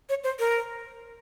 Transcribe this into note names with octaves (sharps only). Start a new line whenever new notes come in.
C#5
C5
A#4